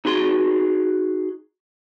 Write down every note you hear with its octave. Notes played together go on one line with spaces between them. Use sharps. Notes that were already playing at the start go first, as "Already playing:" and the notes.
D#4 F#4 G#4 C6